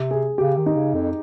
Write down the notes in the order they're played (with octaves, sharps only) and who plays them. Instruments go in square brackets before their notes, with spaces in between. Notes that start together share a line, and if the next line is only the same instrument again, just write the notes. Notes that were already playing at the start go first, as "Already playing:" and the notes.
Already playing: [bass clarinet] C3
[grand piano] G#4
[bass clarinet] C#3 [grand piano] G4
[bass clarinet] D#3
[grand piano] D#4
[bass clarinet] C#3
F2